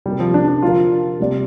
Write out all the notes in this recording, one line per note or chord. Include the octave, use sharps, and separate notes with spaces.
C3 G3 A#3 G4 A#4
F3
D4
D4
D3 F3 D4 F4 A#4 F5
C3 G3 A#3 G4 D5